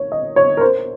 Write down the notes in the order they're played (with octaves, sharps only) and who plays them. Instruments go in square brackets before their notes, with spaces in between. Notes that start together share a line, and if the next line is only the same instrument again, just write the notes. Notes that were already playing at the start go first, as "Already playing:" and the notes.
Already playing: [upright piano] C#5
D#5
C#5
A#4
C5